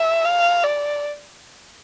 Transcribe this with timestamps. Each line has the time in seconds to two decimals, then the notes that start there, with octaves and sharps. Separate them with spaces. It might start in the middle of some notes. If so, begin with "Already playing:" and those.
Already playing: E5
0.25 F5
0.63 D5